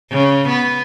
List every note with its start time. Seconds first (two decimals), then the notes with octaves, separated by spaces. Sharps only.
0.12 C#3
0.49 B3